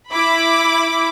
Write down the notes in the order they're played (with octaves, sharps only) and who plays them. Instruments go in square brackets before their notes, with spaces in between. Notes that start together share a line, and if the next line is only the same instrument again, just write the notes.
[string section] E4 B5 D6